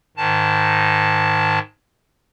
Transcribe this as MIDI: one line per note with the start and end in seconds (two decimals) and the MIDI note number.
0.17 1.59 44
0.17 1.59 51
0.17 1.59 81